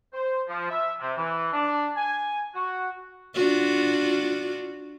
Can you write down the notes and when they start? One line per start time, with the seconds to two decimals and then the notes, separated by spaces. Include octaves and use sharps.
0.13 C5
0.48 F3
0.70 E5
0.99 C3
1.17 E3
1.53 D4
1.97 G#5
2.54 F#4
3.35 D4 F4 F#4